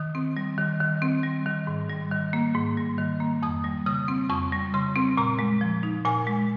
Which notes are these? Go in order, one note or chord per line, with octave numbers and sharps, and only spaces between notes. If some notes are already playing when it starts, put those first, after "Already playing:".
Already playing: D#3 D#6
C4
G3
D#3
D#3
C4
G3
D#3
G#2
G3
D#3
A#3
G#2
G3
D#3
A#3
F2 D#6
G3
C#3 D#6
C4
F2 C#6
G3
C#3 C6
C4
A#2 A#5
G#3
F3
D#4
A#2 G#5
G#3